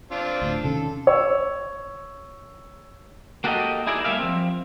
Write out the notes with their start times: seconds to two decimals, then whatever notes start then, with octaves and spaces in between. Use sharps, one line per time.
0.11 C4 D4 F4
0.42 D1 D2
0.64 C3 D#3 C#4 A4
1.07 C#5 E6
3.44 A#3 F#4 G4 A4 A#4 D#5
3.86 D#4 E4 G#4 A#4 D5 E5
4.04 G3 A3 A#3 E5 F5
4.19 F3 C4